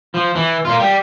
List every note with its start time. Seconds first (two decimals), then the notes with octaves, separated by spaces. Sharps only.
0.14 F3
0.35 E3
0.65 A#3 F4
0.80 G3